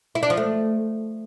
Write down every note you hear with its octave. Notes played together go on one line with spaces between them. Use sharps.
E4
D4
F3
A3